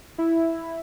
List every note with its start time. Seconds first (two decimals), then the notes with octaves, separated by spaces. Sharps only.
0.18 E4